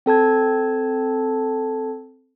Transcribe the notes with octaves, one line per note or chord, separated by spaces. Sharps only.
C4 A4 A5 G#6